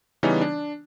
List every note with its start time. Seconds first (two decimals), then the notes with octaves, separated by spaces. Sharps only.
0.23 C#3 E3 G3 B3 C#4 D#4
0.41 D4